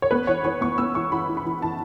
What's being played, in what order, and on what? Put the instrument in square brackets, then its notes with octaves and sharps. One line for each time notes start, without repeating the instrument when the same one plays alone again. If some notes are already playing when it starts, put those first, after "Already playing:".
[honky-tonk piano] C#5
B3 B4
E3 C#5
E3 C#5
B3 C#6
B3 E6
E3 C#6
E3 B5
E3
B5
E3
E3 A5